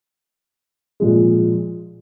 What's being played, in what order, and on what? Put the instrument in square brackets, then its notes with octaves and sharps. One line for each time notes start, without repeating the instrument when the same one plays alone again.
[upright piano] A#2 F3 G#3